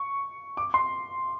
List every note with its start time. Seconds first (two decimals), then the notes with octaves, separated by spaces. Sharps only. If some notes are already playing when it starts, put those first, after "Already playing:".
Already playing: C#6
0.57 D6
0.74 C6